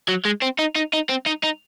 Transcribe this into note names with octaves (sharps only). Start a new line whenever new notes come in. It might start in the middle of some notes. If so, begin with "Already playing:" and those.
F#3
G#3
C4
D#4
D#4
D#4
C4
D#4
D#4